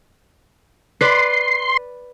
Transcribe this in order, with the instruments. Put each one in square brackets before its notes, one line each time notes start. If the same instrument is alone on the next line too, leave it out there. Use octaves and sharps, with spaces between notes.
[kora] B4 D5 [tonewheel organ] C6